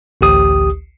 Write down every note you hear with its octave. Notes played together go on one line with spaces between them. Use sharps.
A1 D2 G4 D#6